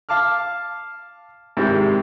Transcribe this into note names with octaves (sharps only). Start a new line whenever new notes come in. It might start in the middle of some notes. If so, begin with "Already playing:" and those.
F5 A5 D6 F6
G#2 C3 D#3 G3 C4 E4